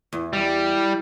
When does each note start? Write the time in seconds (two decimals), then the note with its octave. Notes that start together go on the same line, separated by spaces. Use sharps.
0.13 E2
0.33 G3